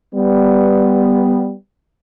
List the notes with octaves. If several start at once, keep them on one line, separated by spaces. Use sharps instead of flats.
G3 B3